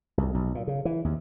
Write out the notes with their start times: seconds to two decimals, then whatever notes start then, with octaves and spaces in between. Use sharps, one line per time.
0.18 C2
0.34 B1
0.55 A#2
0.67 C#3
0.85 E3
1.05 D#2